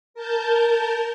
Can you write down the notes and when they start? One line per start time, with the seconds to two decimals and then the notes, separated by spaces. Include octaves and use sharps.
0.14 A#4 A5 G6